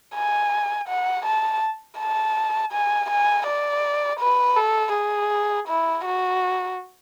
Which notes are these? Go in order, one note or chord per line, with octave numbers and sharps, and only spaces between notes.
G#5
F#5
A5
A5
G#5
G#5
D5
B4
A4
G#4
E4
F#4